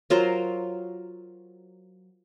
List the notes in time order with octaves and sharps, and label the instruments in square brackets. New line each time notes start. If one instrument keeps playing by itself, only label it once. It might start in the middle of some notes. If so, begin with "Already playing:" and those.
[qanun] F#3 F4 A#4 C5